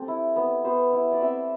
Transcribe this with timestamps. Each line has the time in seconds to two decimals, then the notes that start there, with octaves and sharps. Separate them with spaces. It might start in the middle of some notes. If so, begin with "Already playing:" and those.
Already playing: C4 G4 A4
0.08 E4
0.36 B3
0.64 B3 C5
0.92 E4
1.11 D5
1.21 C4 E5